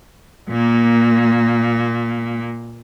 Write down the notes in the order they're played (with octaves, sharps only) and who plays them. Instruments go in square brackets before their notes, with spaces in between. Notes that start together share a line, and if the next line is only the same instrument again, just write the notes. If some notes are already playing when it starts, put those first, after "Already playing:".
[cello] A#2 A#3